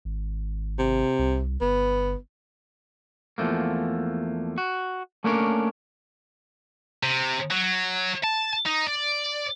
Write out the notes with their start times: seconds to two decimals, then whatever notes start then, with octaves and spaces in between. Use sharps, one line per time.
0.05 G#1
0.79 C3
1.19 C2
1.61 G1 B3
3.38 E2 F3 A3 A#3
4.58 F#4
5.24 A3 A#3 C#4 D4 A#4 C#5
7.03 C3
7.50 F#3
8.24 A5
8.66 D#4
8.87 D5